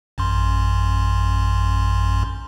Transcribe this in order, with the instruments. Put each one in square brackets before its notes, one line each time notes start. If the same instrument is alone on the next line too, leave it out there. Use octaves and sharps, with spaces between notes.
[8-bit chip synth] A1 F#2 C6